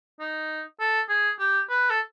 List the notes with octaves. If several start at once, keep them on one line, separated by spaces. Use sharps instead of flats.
D#4
A4
G#4
G4
B4
A4